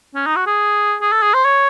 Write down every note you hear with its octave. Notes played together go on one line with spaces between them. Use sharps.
C#4
D#4
F#4
G#4
G#4
A4
G#4
C5
C#5